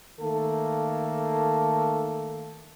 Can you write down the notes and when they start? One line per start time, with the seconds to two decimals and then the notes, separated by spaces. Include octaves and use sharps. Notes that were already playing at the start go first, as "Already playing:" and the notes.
0.20 D#3 A3 A#3 A4